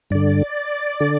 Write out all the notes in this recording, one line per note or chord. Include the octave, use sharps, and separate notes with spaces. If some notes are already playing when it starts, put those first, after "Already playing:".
G2 D3 D5
D3